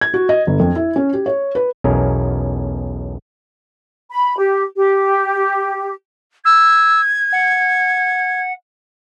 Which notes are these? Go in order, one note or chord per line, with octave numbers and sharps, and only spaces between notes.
G#6
F#4
D#5
G1
F2
E4
C#4
G4
C#5
B4
B1 E2 B2 C#4 G#4 A#4
B5
G4
G4
E6 G#6
F#5